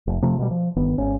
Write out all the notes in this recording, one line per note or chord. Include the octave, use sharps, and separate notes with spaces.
F1
C3 F3 A3
B2 G3
F3
G1 D#3 B3
G#1 C#4